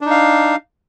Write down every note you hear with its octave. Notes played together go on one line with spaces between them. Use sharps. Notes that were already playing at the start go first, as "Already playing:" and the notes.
D4 D#4 F5